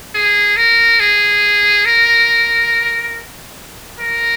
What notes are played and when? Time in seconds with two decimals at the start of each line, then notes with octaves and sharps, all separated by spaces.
0.15 G#4
0.57 A#4
1.00 G#4
1.85 A#4
4.00 A#4